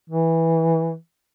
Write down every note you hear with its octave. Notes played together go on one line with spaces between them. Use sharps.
E3